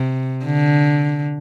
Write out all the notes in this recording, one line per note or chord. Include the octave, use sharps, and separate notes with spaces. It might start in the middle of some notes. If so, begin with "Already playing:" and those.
Already playing: C3
D3